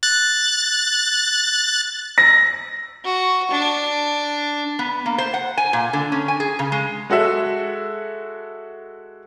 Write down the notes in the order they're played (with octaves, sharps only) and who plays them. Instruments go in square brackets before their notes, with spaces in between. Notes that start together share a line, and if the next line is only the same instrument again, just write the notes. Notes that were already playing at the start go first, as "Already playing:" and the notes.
[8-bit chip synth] F#6 A6
[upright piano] A#6
[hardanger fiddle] F#4
D4
[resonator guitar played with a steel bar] B3
A#3
C5
F#5
G#5
A#2
D3
C#4
G#5
G#4
C#3
G#3
[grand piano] G#3 F#4 A4 E5